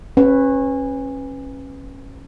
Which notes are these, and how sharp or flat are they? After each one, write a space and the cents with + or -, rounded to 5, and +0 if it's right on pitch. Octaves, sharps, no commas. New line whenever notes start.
C#4 -25 B4 +5